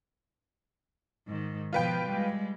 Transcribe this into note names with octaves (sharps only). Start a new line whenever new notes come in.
G#2 D#3
B2 F3 F4 B4 G5
G3 G#3